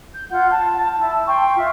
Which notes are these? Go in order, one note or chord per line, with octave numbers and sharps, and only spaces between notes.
G6
F4 F#5 G6
A5
E4 A5
G5 C6 C#6
F4 E5